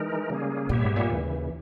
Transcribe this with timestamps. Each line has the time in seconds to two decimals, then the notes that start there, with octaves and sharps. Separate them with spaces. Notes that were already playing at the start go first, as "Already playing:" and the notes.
Already playing: E3 G#3 D#4 A#4
0.30 C#3 G3 A#3 C#4 G#4
0.69 A#2 G3 B3 G4 C#5 E5
0.83 G#2
0.96 A#2
1.10 D#2 C#3 E3